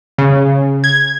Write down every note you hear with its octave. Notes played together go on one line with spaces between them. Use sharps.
C#3
G#6